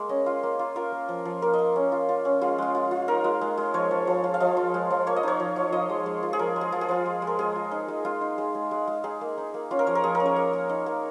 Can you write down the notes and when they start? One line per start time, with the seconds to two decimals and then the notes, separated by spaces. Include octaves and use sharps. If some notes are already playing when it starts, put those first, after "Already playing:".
Already playing: G#3 A#3
0.09 C#4 D#5
0.26 F4
0.43 A#3
0.59 F4
0.76 F4 A#4
0.92 A#3
1.09 F3
1.25 F3
1.42 A#3 A#4
1.54 D#5
1.59 A#3
1.76 C#4
1.92 F4
2.09 F4
2.25 C#4
2.41 G#3 F4
2.58 G#3 F4
2.75 F4
2.91 F4
3.08 D#4 A#4
3.24 G#3
3.41 G#3
3.58 G#3
3.74 F3 C#5
3.91 F3
4.07 F3
4.24 F4
4.34 F5
4.40 F3 D#5
4.57 F4
4.74 G#3
4.90 F3
5.07 A#3 C#5
5.16 D#5
5.23 D#4 C#5
5.40 F3
5.56 F3
5.72 F4 D#5
5.90 G#3
6.06 G#3
6.23 F4
6.33 G#4
6.39 F3 A#4
6.56 G#3
6.61 G#4
6.72 F3 F4
6.81 G#4
6.89 F3 F4
7.06 G#3
7.22 G#3
7.27 A#4
7.39 G#3 G#4
7.56 F4
7.71 D#4
7.88 G#3
8.05 G#3 F4
8.21 D#4
8.38 G#3
8.55 G#3
8.71 G#3
8.88 G#3
9.04 D#4 G#4
9.21 A#3
9.38 D#4
9.54 A#3
9.71 C#4 F4
9.79 A#4
9.87 F3 C#5
9.95 A#4
10.04 F3 G#4
10.15 A#4
10.20 C#4
10.26 C#5
10.36 A#3
10.53 A#3
10.69 D#4
10.86 A#3